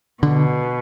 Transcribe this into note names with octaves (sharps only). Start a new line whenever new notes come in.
B2 D3